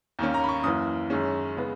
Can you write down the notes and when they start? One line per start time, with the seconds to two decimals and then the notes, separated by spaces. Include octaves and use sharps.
0.19 D#2 D#3 A#3 C#4
0.34 A#5
0.44 B5
0.49 C#6
0.64 F#2 E3 A#3 D#6
1.10 F#2 D#3 G#3 C#4
1.57 C#3 G#3 B3